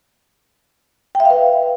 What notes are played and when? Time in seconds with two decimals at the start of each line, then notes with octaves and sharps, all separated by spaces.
1.15 G5
1.20 E5
1.25 F5
1.30 B4